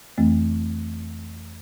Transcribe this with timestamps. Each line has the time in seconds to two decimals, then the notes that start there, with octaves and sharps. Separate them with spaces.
0.18 F2 E3 A3 C4